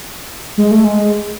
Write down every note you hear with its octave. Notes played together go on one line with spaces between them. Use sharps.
G#3
A3
G#3